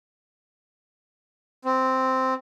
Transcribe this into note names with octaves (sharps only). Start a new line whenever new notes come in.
C4